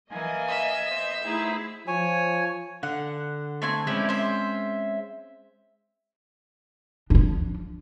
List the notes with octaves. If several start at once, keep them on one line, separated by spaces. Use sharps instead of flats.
E3 A#3 D#5 F5 G#5
E5
B3 C5
A3 D#4 E4 G#4
F3 C#5 G#5
D3 F#5
A3 C4 G#5
G#3 C4 C#4 E4 D5
C5 E5
F3 D4